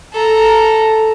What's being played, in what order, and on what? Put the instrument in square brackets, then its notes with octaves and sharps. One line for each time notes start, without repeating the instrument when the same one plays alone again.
[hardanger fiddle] A4 A#5